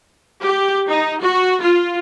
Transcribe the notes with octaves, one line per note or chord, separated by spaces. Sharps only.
G4
D#4
F#4
F4